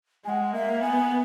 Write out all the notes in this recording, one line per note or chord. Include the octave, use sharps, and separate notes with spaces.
G#3 F#5 G#5
A#3 E5
B3 G#5